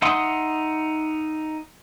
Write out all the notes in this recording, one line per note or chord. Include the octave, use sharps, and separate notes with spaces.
D#4 E5 F#5 C6 D#6